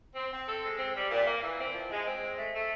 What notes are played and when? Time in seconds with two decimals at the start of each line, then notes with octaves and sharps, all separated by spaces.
0.15 C4
0.32 C4
0.47 A4
0.63 G#3
0.79 C4
0.95 G3
1.10 A#2
1.26 A#3
1.43 E3
1.59 C4
1.74 F3
1.90 G#3
2.06 C4
2.21 G#3
2.37 A3
2.54 A3